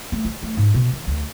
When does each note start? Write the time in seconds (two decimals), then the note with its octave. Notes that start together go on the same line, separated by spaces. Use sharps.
0.12 A3
0.25 F4
0.43 A3
0.57 G#2
0.74 B2
0.93 E3
1.07 D2